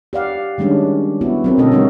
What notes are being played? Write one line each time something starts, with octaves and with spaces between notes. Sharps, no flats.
G4 D5 F5 F#5
D#3 G3 G#3 C#4 D4
B3 E4 F#4
F#3 C4 A#4
B2 D3 A3 C#4 A4 D#5
G3 G#3 D#4 F#4 A#4